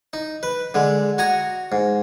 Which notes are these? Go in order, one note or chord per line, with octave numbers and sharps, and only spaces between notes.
D#4
B4
D3 G#3
F#4 G#5 A#5 C#6 D#6
G#2